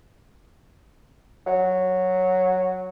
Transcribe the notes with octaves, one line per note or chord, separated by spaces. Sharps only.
F#3